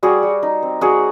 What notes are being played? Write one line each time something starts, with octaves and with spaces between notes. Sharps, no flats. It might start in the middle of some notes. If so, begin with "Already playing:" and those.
G3 F#4 G#4
G3
D#4
C4
G3 F#4 G#4